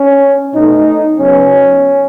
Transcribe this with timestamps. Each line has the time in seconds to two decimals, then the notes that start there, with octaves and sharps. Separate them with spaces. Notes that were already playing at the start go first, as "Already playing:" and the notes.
Already playing: C#4
0.54 B2 A3 D#4
1.19 C#3 F#3 B3 C#4